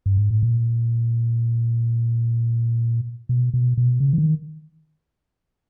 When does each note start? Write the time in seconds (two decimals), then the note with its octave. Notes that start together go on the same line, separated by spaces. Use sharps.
0.06 G2
0.17 G#2
0.31 A2
0.43 A#2
3.29 B2
3.54 B2
3.77 B2
4.00 C#3
4.13 E3
4.18 D#3